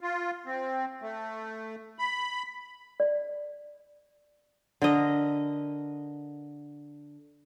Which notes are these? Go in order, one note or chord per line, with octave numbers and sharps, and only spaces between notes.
F4
C4
A3
B5
D5
D3 A#4 D#5